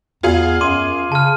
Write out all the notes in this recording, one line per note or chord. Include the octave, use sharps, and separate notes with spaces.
E2 F4 G#4 F5
F#2 C6 D6 D#7
C#3 A5 F6